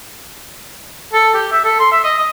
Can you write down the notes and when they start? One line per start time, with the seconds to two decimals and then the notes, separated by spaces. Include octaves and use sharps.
1.13 A4
1.34 G4
1.52 E5
1.65 A4
1.79 C6
1.92 E5
2.04 D#5
2.18 D#5